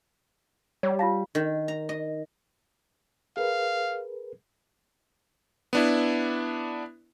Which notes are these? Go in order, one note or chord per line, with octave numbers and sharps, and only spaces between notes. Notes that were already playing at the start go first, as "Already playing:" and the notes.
G3 C#5
F4 F5 A5 A#6
D#3
A#5
D#5
G#4 A#4 B4 F5
B3 D4 E4